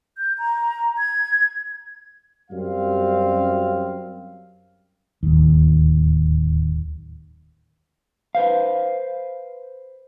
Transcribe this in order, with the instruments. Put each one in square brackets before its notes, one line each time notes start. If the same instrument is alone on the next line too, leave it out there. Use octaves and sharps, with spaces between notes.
[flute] G6
A#5
G#6
[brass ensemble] F#2 G3 C4 F5
[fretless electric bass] D1 D#2
[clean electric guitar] B4 C5 F5